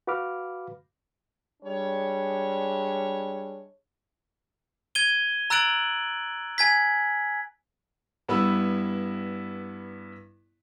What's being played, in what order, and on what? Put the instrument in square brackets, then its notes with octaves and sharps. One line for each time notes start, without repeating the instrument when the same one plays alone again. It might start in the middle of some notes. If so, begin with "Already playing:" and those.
[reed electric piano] F#4 B4 F5 B5 D6 F6
[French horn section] G3 G#3 D4 C#5
[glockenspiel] G#6 D#7 G7
A#5 E6 F#6 A6 D7 F#7
G#5 G#6 B6
[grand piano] G2 B3 E4 B5 E6